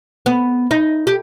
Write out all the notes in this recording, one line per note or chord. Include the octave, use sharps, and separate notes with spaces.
B3
D#4
G4